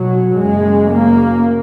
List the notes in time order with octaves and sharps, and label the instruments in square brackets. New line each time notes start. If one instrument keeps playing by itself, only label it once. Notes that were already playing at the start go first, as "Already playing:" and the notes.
Already playing: [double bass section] B1 B2 F#3
F#1 F#2 C#3 G#3
A#3